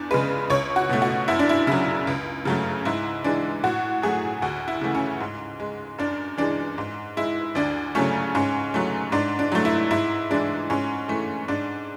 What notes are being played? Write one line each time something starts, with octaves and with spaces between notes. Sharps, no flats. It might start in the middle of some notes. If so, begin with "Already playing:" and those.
Already playing: E2 D4
C#3 G#3 B4
C#2 C#5
F#4
B2 A3
F#4
F#2 E4
D4
E4
C#3 F#3 E4
C#2
C#3 F#3 A3
G#2 E4
E3 G#3 D4
A2 F#4
F#3 A3 G#4
D2 F#4
E4
C#3 E3 A3
C#4
G#2
G#3
F#2 D4
E3 G#3 D4
G#2
G#3 E4
D2 D4
C#3 F#3 A3 C#4
G#2 C#4
F#3 A3
G#2 D4
D4
F#3 A3
E4
G#2 E4
E3 G#3 D4
G#2 C#4
E3 A3
G#2 D4